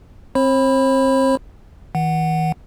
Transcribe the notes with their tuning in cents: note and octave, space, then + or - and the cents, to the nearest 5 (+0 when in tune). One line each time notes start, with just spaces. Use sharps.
C4 +20 C5 +45 B5 +0
E3 -40 F#5 +0